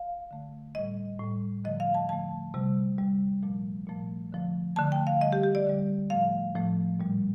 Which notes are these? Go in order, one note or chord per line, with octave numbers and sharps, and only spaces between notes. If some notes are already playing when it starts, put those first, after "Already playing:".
Already playing: F5
D3 A3
A2 G3 D#5
A2 G3
D3 F3 A3 D#5
F5
A5
D3 F3 A3 A5
C3 G3
C3 G3
A#2 F3 A3
A#2 F3 A3
D3 F3 A3
D3 F3 A3 A5
G5
F5
D3 G3 D#5
G4
G4
D5
D3 G3
A2 F3 A3 F5
A2 F3 A3
A#2 G3